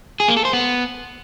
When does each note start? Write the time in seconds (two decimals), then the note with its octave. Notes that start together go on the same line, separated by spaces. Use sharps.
0.20 G#4
0.28 A#3
0.37 A4
0.45 C5
0.53 B3